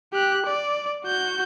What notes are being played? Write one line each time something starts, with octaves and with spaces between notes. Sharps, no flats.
G4 F#6
D5
F#4 G6